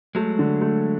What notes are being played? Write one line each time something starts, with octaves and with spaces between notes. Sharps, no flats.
F#3 G#3 A3
D3
A3